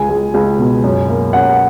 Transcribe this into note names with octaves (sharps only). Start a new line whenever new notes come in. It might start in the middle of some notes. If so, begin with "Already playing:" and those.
Already playing: C#2 G#5
G#3
C#2
B2
F#2
A#3
C#4 F#5